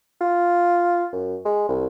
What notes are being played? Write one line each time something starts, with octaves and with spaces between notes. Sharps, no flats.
F4
F#2
G#3
C2